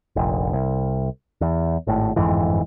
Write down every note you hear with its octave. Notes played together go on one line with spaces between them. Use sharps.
F1 A#1
C2
E2
G#1 A2
G1 F2 G#2 E3